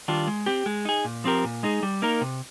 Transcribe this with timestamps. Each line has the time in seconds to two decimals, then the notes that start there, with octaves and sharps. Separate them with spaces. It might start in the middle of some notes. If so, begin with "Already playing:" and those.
0.08 D#3 G3 D4 F4
0.27 G#3
0.46 C4 G4
0.66 G#3
0.85 D#4 G#4
1.05 A#2
1.24 F3 C4 G4 A#4
1.44 A#2
1.63 G#3 D#4 G#4
1.83 G3
2.02 A#3 D#4 A#4
2.21 C3